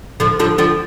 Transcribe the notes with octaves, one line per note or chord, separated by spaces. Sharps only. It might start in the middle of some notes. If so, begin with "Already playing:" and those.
D3 F3
D3 F3
D3 F3